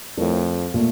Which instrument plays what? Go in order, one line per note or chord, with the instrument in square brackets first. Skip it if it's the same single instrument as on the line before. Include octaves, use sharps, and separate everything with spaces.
[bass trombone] F2 [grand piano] A3 E4 A#4 C#5
[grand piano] A#2 A3